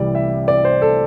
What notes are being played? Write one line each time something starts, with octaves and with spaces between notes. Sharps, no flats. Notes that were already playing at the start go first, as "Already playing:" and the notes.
Already playing: C2 C3 E3 G3 D5
E5
D5
C5
A4